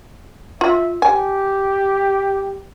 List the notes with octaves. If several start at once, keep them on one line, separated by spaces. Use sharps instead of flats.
F4 E5
G4 G#5